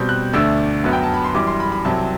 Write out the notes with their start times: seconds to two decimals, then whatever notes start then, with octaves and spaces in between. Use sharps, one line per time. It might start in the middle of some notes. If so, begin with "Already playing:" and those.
Already playing: B2 G3 C4 G6
0.09 F#6
0.33 D2 D3 A3 D4 E6
0.84 F#2 F#3 B3
0.93 G5
1.03 A5
1.14 B5
1.24 C6
1.34 F#2 E3 G3 D6
1.47 C6
1.60 B5
1.72 B5
1.85 C2 C3 F#3 C4 A5